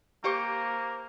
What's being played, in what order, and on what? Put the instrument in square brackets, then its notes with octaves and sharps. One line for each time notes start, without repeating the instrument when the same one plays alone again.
[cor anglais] A#3 [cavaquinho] G4 C5 C#6